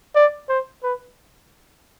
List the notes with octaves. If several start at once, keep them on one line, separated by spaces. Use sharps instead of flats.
D5
C5
B4